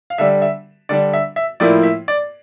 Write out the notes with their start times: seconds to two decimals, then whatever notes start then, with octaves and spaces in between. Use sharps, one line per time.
0.10 F5
0.18 D3 G3 D4 E5
0.42 E5
0.89 D3 G3 D4 D5
1.13 E5
1.36 E5
1.60 A2 F3 A#3 E4 D5
1.83 E5
2.08 D5